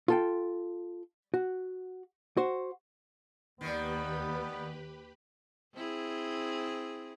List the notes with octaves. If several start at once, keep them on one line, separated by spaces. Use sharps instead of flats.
F4 A4 G5
F#4
F#4 C5
D#2 D#3 G3 B3 G4 B4 B5
C4 E4 G#4